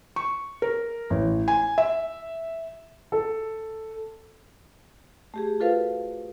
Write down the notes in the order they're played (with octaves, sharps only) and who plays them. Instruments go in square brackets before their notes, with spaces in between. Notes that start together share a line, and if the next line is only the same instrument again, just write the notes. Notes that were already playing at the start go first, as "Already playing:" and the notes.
[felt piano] C#6
A#4
A1
G#5
E5
[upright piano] A4
[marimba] A3 G4 G#4
F4 F#4 A4 B4 C5 F5